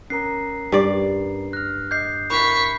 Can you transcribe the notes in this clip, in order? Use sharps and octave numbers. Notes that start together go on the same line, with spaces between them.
C#4 A#4 A#5 C7
G2 D5
F6 F#6 A#6
D#5 D6 G6 C7
E4 A#4 B5 C#6 B6 C7